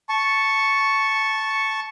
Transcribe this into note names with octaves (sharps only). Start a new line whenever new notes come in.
A5 C#6